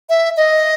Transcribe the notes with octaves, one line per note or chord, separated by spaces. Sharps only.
E5
D#5